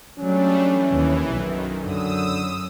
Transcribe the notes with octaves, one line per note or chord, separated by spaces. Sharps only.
F#3 G3 A3 C#4 D4
E3
D#2
B1 F#2 D#3
F#2 D3 D#6 E6